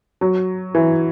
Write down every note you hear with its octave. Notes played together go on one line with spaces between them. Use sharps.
F#3
E3